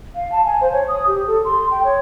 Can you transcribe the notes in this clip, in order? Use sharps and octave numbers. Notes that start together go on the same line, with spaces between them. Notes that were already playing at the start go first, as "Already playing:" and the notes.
F5
A5
G#5
C5
C#5
D#6
G4
A4
C6
G5
C#5